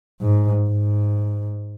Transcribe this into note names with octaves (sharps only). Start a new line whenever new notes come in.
G#2
G#2